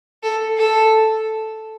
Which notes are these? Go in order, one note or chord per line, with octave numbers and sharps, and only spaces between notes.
A4
A4